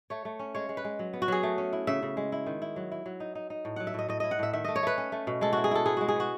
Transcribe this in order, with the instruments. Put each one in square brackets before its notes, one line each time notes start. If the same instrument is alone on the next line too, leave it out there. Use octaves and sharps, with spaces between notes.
[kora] A3 C#5
A3
C#4
G#3 C#5
G#3
B4
G#3
F#3
B3
F#4
F#3 G#4
A3
C#4
E4
C#3 E5
C#3
G#3
E4
D#3
E4
F#3
E4
F#3
D#4
D#4
D#4
A2
F#3 F#5
E5
A2 D#5
A2 D#5
E4 D#5
F#5
A2 E5
D#3 E5
A3 D#5
C#5
A3 B4
C#4
A3
B2
G#3 A4
E4 F#4
G#4
E4 A4
B3 G#4
G#3 F#4
G#4
B3 F#4